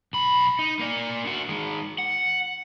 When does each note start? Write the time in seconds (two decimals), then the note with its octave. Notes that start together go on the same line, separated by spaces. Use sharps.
0.13 B1 B5
0.59 D#4
0.79 A#3 D5
1.25 D4 F#4
1.49 D#3 G#3
1.98 F#5